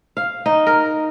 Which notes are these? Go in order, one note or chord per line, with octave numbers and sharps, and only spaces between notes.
F5
D#4
A#4